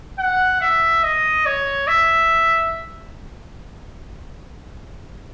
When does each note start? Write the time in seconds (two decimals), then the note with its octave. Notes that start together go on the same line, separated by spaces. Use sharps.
0.19 F#5
0.61 E5
1.03 D#5
1.46 C#5
1.88 E5